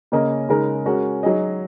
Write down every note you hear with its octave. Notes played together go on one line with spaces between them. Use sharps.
C#3 A#3 C#4 A#4 D#5
C#3 G#3 D#4 A#4
G#3 C#4 F#4 A#4
F#3 D#4 G#4 D#5